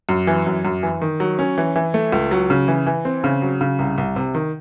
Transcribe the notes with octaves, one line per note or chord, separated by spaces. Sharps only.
F#2
E3
F#2
F#2
E3
D#3
F#3
C#4
E3
E3
A3
C#2
F#3
C#3
E3
E3
C4
C#3
F#3
C#3
C2
C2
C3
D#3